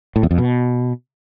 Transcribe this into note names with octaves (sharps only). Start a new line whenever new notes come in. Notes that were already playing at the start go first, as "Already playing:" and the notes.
A2
E2
F2
B2